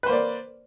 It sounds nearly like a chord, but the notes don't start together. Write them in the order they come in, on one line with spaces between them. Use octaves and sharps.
B4 C5 A#3 D5